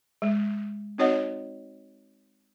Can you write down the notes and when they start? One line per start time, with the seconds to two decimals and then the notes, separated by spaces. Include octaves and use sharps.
0.22 G#3
0.98 C4 D#4 F#4 C#5 D#5 F#5